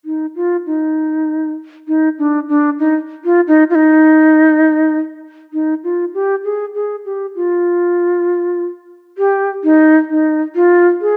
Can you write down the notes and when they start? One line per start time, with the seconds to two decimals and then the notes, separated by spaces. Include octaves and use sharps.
0.05 D#4
0.36 F4
0.66 D#4
1.88 D#4
2.19 D4
2.49 D4
2.79 D#4
3.25 F4
3.48 D#4
3.70 F4
3.75 D#4
5.53 D#4
5.84 F4
6.14 G4
6.44 G#4
6.75 G#4
7.05 G4
7.36 F4
9.18 G4
9.64 D#4
10.10 D#4
10.55 F4
11.01 G#4